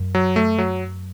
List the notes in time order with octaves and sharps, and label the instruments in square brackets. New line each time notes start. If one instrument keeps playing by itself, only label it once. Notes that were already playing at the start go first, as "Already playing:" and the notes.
Already playing: [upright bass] F#2
[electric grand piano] F#3
A3
F#3